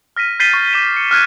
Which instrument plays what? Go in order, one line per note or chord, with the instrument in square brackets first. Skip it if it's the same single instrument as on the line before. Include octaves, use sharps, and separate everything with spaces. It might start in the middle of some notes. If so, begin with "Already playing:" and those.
[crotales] F6 A#6 B6 D#7
G6 A6 B6 C7 D#7 G7
C#6
D6 G6 D#7 E7
C#7
F6 F#6 G#6 D#7